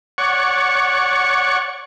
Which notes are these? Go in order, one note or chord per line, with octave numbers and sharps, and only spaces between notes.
C#5 D5 F#5 C#6